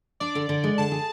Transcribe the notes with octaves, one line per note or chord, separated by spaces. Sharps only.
D4 D5
D3
D3
G#3
D3 A5
G#4